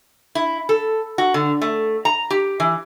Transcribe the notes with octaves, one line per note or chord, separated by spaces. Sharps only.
E4
A4
F#4
D3
A3
A#5
G4
E3